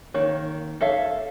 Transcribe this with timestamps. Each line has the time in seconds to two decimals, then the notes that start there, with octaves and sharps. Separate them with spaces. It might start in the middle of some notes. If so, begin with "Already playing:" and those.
0.14 D#3 A#3 C#5
0.81 A4 C#5 E5 F5